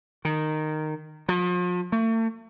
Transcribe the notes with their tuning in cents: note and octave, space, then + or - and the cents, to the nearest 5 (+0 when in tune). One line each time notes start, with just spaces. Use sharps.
D#3 -10
F3 +40
A3 +40